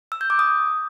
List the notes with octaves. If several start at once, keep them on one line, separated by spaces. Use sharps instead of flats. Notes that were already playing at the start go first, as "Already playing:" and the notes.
E6
G6
D6
D#6